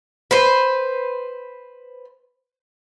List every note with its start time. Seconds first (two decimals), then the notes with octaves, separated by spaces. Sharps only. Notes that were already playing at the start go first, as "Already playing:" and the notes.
0.31 B4 C5